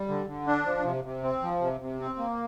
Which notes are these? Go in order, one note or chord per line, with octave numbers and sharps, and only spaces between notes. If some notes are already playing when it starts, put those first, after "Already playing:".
Already playing: G3
D3
D3
D4
F3
C3
C3
C4
F3
C3
C3
C4
A#3